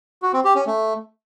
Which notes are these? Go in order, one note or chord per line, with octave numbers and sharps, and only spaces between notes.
F#4
C4
G4
C#4
A3